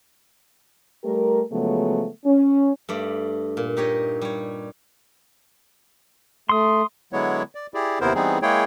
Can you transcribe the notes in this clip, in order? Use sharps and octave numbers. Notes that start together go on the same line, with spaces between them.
G3 A3 G4 A#4
C#3 F3 F#3 G#3 A3 B3
C#4
G2 A3 D5
A#2
D#4 G4 C#5 D#5
G3 C#5
A3 C6 D#6
D3 F#3 G#3 B3 E4 C#5
D5
E4 G4 G#4 D5
D#2 C3 B3 E4 A#4 C5
E3 G3 B3 C4 D#4 G#4
G#3 A#3 E4 G#4 C#5 G5